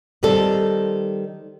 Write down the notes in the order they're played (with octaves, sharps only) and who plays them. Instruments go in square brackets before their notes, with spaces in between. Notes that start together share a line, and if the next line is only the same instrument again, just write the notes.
[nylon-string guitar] D#3 G3 C4 A4